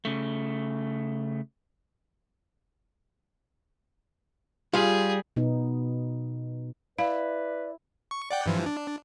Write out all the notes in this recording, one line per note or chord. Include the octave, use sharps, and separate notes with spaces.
C#3 A3
G3 F4 G#4 F5
B2 B3 D#4
E4 B4 D5 F5
C#6
D5 F#5 G5
G2 E3 F3
D4